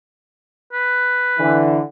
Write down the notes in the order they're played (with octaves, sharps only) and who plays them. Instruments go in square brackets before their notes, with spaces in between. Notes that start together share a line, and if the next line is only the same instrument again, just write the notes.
[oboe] B4
[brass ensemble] D3 E3